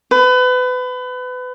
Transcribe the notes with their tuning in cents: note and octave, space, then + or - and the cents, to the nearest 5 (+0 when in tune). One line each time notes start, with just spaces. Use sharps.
B4 +30